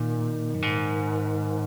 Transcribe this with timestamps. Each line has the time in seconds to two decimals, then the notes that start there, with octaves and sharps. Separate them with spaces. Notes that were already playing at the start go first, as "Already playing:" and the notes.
Already playing: A#2 D#3
0.54 F#2
0.62 G#2